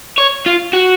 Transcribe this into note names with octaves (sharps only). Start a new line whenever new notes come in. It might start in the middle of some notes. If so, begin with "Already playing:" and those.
C#5
F4
F#4